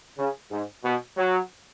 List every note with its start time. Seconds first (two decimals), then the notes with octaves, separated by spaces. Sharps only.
0.18 C#3
0.51 G#2
0.85 B2
1.17 F#3